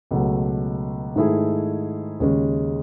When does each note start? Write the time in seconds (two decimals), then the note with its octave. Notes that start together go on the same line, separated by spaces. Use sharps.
0.11 C#2 B2 F#3 A3
1.16 G#2 D#3 A3 E4 G#4
2.20 D#2 C#3 G#3 C#4